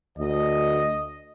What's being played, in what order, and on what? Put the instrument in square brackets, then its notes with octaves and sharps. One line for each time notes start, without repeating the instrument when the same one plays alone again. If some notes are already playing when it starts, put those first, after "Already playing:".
[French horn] D2 [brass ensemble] D#5